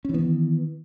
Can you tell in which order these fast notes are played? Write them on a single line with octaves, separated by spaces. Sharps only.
C#4 E3 B3 D#3